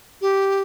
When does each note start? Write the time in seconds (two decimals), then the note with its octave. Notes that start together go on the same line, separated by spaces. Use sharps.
0.21 G4